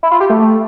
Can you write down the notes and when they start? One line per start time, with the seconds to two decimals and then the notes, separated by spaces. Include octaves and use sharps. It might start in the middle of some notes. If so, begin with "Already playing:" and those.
0.03 E4
0.11 F4
0.20 G4
0.30 A3